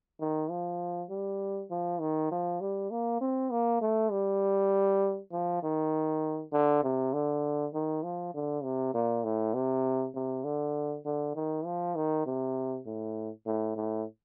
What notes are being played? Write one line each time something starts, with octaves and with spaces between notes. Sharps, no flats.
D#3
F3
G3
F3
D#3
F3
G3
A#3
C4
A#3
A3
G3
F3
D#3
D3
C3
D3
D#3
F3
D3
C3
A#2
A2
C3
C3
D3
D3
D#3
F3
D#3
C3
A2
A2
A2